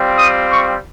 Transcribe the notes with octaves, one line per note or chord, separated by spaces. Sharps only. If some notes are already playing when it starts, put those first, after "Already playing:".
Already playing: G3 C4 F4
D#6
C#6